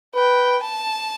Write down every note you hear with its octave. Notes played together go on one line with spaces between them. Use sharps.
B4 G5
A5